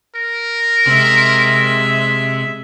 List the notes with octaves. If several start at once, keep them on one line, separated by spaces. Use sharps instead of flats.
A#4
C3 G#3 E5